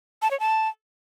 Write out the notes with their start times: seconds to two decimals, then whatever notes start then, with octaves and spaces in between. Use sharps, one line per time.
0.22 A5
0.31 C#5
0.40 A5